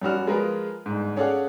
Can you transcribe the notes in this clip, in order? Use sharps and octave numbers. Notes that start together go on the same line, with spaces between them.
F#2 G3 F#4 F6
F3 G#3 F4 G#4 A#4 B4
G1 G#2
C#4 G#4 A4 D5 F5 F#5